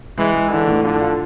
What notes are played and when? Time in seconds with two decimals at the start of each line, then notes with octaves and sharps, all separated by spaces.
0.18 E3 G#3
0.34 G#3
0.51 D3 E3
0.67 A2
0.84 D3 F3
1.01 F4